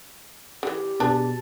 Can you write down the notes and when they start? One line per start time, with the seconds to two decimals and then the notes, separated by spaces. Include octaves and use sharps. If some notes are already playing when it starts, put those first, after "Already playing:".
0.63 D3 E3 G4
1.00 B2 D4 G#4 B4 A5